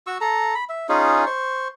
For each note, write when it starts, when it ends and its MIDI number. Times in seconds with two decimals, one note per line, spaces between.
0.07 0.18 66
0.07 0.18 85
0.07 0.18 88
0.21 0.54 69
0.21 0.54 82
0.55 0.64 83
0.69 0.87 76
0.89 1.25 61
0.89 1.25 63
0.89 1.25 65
0.89 1.25 68
1.26 1.68 72
1.26 1.68 85